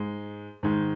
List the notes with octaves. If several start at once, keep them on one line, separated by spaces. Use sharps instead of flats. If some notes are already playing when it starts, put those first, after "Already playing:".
Already playing: G#2 G#3
G#2 D#3 G#3